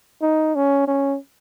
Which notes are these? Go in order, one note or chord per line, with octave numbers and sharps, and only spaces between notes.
D#4
C#4
C#4